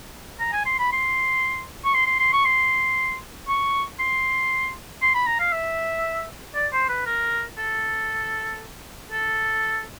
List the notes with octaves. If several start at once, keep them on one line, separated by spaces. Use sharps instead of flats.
A#5
G#5
C6
B5
C6
C#6
C6
C6
C6
C#6
C6
C#6
C6
C6
B5
A#5
F5
E5
D5
C5
B4
A#4
A4
A4